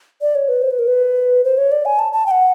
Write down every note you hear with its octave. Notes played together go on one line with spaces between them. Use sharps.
D5
C#5
B4
C5
B4
A#4
B4
C5
C#5
D5
G#5
A5
A5
G5
F#5